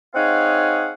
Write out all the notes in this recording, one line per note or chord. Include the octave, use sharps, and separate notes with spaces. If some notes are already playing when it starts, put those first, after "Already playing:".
C4 D#4 G#4 C#5 F5 F#5